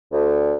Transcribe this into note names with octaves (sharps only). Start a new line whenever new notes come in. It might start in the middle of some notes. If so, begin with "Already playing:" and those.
D2